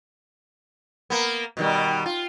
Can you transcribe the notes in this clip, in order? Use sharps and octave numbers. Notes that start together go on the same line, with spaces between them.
A#3 B3
B2 D#3 G3
F4